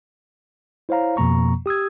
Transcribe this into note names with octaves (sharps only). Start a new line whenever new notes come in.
E4 C5 C#5 F5 A#5
F2 B2 F3 A#3 A#5 C#6
G4 D#6 E6 G#6